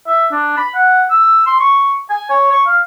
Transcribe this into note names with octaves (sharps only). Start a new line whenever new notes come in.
E5
D4
B5
F#5
E6
C6
C#6
G#5
C#5
C#6
F5